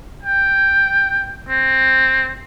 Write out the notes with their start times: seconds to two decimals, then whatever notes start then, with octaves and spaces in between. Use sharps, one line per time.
0.23 G5
1.49 C4